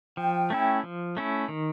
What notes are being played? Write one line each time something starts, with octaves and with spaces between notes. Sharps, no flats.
F3 G5
A3 C#4 E4
F3
A3 C#4 E4
D#3